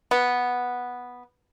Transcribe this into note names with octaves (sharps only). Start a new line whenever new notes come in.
B3